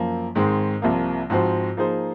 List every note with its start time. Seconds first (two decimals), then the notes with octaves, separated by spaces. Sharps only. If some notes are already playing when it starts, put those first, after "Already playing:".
Already playing: F#2 F3 A#3
0.35 G#2 D#3 G#3 C4
0.82 C2 C3 F3 A#3
1.30 G#2 F3 C4 F#4 C5
1.77 F3 A#3 D#4 G#4 C5